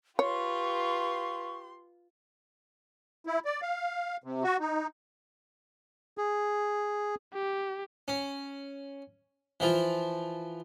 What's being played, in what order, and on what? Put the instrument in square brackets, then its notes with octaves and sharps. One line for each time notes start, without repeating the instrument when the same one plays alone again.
[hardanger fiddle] F4 B4 [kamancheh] G4 C6 [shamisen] C#5 [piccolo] C#6
[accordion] E4
D5
F5
C3
F#4
D#4
[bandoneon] G#4
[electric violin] G4
[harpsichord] C#4
E3 F3 F4